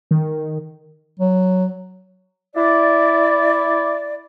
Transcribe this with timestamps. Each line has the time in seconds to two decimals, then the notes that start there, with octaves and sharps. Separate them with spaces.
0.11 D#3
1.20 F#3
2.55 E4 D5